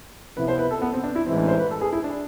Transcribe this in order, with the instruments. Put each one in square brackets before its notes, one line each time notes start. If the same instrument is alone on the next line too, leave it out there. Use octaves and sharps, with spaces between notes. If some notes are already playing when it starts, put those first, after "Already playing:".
[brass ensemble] F2 C3 F3 B3 E4 [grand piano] B4
[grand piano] C5
B4
A4
B3
C4
D4
E4
[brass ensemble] A1 G#2 E3 [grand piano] C4
[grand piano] D4
C5
B4
A4
G#4
E4
D4